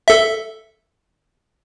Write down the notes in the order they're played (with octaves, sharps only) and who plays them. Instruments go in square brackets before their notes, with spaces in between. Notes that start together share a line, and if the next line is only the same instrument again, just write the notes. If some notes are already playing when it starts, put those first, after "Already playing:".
[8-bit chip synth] A4 E5